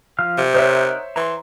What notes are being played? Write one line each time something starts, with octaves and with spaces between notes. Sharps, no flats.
F3 F5 F6
C3
D#4 A#4 C5 C#5 E5 F#5
E3 A#5 C6